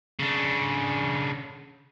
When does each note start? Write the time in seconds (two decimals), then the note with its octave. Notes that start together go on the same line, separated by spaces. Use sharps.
0.20 C#3 D4